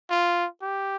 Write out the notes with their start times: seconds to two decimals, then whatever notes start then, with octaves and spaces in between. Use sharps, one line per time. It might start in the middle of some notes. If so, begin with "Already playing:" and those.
0.10 F4
0.62 G4